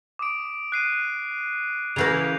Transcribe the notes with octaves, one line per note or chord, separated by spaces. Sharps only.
D6 D#6 D7
F#6 C7 D#7
C#3 E3 A#3 G6 C7 F7